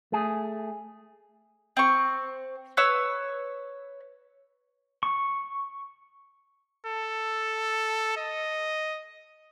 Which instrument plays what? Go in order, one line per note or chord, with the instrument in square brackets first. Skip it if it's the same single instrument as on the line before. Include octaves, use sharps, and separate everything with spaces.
[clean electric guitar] A3 G#4
[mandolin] C4 C#6
B4 C#5 E6
[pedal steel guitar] C#6
[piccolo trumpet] A4
D#5